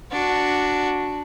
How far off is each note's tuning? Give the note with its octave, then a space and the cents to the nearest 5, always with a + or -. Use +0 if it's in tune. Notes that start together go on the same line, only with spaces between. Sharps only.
D4 +0 F#4 +0